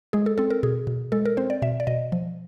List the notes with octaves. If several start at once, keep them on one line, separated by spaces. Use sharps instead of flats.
G#3 G#4
A4
C4 A4
A#4
B2 G#4
B2
G#3 A4
A#4
C4 C5
D5
B2 E5
D5
B2 D#5
F3